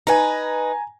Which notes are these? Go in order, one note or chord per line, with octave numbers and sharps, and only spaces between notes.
D#4 B4 G#5 A#5